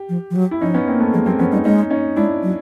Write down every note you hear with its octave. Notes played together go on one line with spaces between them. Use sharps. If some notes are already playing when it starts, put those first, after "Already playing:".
Already playing: G4
F3
F3
F#3
E4
F3 C#4 D#4
B3 C#4
A#3 C4
A3 B3
F3 G#3 A#3
F#3 A#3 C4
F3 B3 C#4
G3 C#4 D#4
G#3 C#4 D#4
C#4 D#4
G#3 D4 E4
F#3